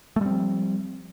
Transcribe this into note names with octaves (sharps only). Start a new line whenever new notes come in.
F3 G3 A3 C4